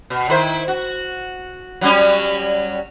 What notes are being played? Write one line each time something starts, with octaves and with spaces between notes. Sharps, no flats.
B2
D#3 E4 C5
F#4
F#3 G3 C#4